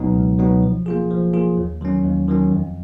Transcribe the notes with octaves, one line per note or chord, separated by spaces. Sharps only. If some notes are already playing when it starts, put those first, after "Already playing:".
Already playing: C#2 B2 F#3 B3 D#4
C#2
B2 F#3 B3 D#4
F3
A#3 F4 G#4
F3
A#3 F4 G#4
D#2
D#3 F#3 C#4
D#2
D#3 F#3 C#4
F2